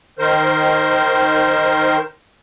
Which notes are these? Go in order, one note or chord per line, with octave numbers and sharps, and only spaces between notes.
D#3 A#4 C5